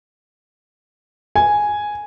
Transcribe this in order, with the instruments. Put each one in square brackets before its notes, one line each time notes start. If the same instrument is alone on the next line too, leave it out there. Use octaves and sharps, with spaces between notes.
[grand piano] G#5